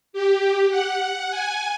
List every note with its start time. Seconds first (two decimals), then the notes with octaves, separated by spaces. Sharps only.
0.13 G4
0.69 F#5
1.30 G#5